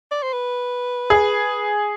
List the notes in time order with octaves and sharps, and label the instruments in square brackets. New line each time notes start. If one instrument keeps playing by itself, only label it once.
[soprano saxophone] D5
C5
B4
[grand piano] G#4